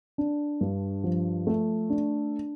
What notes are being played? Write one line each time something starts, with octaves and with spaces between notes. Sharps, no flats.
D4
G2
F3
A3
D4